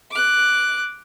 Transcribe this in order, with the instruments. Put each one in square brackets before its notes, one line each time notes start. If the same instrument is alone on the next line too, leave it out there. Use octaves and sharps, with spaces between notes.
[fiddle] D6 F#6